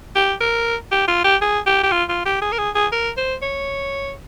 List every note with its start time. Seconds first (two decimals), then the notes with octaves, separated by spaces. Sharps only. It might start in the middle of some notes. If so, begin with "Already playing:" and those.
0.16 G4
0.41 A#4
0.92 G4
1.08 F4
1.24 G4
1.42 G#4
1.67 G4
1.84 G4
1.92 F4
2.09 F4
2.26 G4
2.42 G#4
2.52 A#4
2.58 G#4
2.75 G#4
2.93 A#4
3.17 C5
3.42 C#5